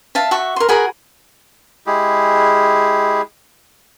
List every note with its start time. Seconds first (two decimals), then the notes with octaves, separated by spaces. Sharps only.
0.15 E5 F5 A5
0.31 F#4 E5 C#6
0.56 A#4 C6
0.69 F#4 G#4 A#4 B5
1.87 G#3 E4 G4 G#4